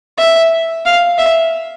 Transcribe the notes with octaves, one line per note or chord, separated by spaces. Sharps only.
E5
F5
E5